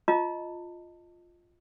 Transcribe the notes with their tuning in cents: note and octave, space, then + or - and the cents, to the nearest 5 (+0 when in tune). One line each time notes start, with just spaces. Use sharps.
F4 +0 D#5 +0 A5 +30